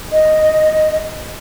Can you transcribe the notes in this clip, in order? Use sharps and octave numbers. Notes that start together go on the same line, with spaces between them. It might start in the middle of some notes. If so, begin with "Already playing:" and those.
D#5